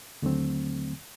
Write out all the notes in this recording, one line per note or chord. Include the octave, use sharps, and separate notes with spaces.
D#2 D3 F#3 A3 C4